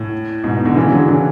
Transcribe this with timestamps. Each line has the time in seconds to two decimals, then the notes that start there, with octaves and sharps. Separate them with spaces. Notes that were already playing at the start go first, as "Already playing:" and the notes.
Already playing: A2
0.44 G#2 B2
0.65 B2 D3
0.76 C#3 E3
0.92 D3 F#3
1.08 C#3 E3